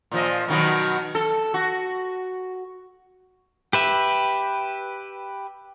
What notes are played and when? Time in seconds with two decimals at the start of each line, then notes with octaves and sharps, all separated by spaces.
0.11 A#2 F3 D#5
0.48 B2 D#3 F#3
1.15 A4
1.54 F#4
3.73 G4 B4 E5